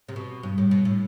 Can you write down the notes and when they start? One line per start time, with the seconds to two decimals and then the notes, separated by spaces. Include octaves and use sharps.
0.08 C3
0.16 B2
0.43 G2
0.58 A2
0.71 B2
0.85 A2